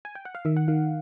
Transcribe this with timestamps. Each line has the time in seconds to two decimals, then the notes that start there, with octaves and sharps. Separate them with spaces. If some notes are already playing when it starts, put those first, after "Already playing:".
0.05 G#5
0.15 G5
0.25 F#5
0.35 F5
0.45 D#3 E5
0.57 F#5
0.68 D#3 F5